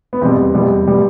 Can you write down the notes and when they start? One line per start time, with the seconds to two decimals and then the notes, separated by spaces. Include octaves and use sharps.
0.13 B3
0.21 E2 B2 G3 C4
0.54 E2 B2 G3
0.87 B2 G3